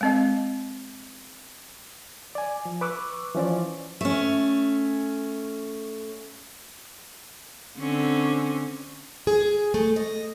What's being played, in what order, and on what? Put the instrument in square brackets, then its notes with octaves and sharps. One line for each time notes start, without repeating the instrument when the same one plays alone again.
[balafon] G#3 C4 D#5
[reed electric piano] D5 G#5
F3
B4 C#6 D6 E6 F#6
E3 F3 C#4 C5 D5
[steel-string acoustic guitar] A3 C#4
[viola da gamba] D3 C4 C#4
[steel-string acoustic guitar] G#4
A3
D#5